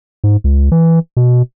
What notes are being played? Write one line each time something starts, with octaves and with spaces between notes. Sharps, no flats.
G#2
C#2
E3
B2